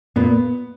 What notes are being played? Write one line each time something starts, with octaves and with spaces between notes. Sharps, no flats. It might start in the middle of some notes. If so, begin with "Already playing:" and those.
A#2 B3